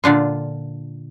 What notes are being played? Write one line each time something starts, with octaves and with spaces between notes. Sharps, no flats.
A#2 D3 D4 F4